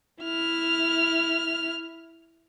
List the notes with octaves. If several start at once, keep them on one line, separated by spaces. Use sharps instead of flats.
E4 F6